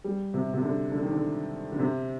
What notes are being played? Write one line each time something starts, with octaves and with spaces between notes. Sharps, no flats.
G3
C3
C3
D3
D3
D#3
D3
D3
C3